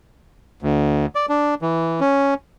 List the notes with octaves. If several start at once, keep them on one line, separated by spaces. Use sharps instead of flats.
D2
D5
D4
E3
C#4